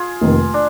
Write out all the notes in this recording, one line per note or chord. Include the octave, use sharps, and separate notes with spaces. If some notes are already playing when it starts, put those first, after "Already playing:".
Already playing: F4 G#4
F1 F2 D#3 A#3
D4